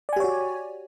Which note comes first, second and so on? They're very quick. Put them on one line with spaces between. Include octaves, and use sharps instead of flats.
D5 G#5 G4 C#5 F#4